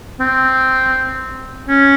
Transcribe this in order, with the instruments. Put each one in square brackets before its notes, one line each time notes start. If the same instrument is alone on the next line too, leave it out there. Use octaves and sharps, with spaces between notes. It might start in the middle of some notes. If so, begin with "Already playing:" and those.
[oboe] C4
C#4